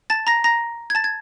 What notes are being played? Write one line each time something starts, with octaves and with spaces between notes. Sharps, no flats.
A5 A6
A#5 A#6
A#5 A#6
G#6
A5 A6
G#6